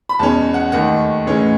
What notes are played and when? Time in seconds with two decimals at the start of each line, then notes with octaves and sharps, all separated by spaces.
0.09 B5
0.19 E2 B2 G#3 C#4 A5
0.54 F#5
0.72 D#2 D#3 A3 F#5
1.27 A2 E3 G#3 C#4